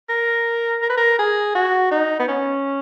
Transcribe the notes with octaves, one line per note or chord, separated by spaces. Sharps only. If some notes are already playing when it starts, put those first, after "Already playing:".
A#4
A#4
B4
A#4
G#4
F#4
D#4
B3
C#4